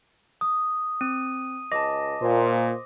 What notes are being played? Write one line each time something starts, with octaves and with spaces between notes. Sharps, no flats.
D#6
C4 D#7
C#2 D#5 A5 D6 A#6
A#2 C5